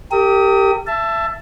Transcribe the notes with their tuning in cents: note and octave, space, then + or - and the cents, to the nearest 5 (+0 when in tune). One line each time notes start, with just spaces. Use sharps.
G4 +0 A#4 -40 D#6 +30
E5 +25 A5 +0